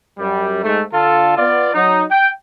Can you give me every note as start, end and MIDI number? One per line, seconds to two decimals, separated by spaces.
0.19 0.63 42
0.19 0.63 55
0.63 0.82 44
0.63 0.82 57
0.93 1.35 50
0.93 1.35 65
0.93 1.35 69
1.36 1.73 59
1.36 1.73 65
1.36 1.73 74
1.74 2.04 54
1.74 2.04 63
2.11 2.29 79